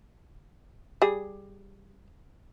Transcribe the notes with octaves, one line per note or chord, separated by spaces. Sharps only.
G3 G#4